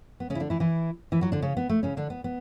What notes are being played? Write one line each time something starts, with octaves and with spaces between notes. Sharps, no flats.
B3
C#3 C#4
E4
D3 D4
E3 E4
E3 E4
E3 E4
F#3 F#4
D3 D4
C#3 C#4
B3
A3
C#3 C#4
D3 D4
B3
B3